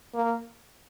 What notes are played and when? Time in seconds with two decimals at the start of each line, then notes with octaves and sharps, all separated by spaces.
0.15 A#3